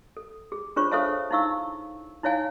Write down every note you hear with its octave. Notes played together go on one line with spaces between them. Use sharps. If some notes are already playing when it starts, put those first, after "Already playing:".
A4
G#4
D4 F4 G#4 C5 C#5 C#6
A4 C5 C#5 E5 F5 A5
D#4 E4 F5 C#6 E6
D#4 E4 C#5 F5 G#5